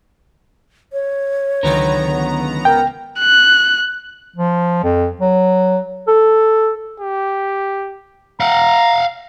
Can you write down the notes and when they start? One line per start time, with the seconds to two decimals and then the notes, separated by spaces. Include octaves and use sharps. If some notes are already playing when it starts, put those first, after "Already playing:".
0.93 C#5
1.63 C#2 D3 D#3 F#3 B3 A#5
2.65 A#4 G5
3.20 F#6
4.36 F3
4.83 F2
5.20 F#3
6.07 A4
7.00 G4
8.40 F5 F#5 A#5